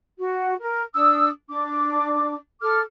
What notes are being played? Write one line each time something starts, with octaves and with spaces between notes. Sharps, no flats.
F#4
A#4
D4 D#6 E6
D4 D6
A4 D6 F6